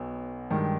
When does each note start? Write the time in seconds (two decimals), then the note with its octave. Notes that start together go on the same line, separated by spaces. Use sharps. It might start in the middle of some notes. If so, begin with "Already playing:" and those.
Already playing: B1 B2 B3
0.50 G2 D#3 G#3